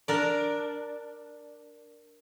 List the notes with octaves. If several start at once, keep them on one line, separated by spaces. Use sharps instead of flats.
D4 A#4 D5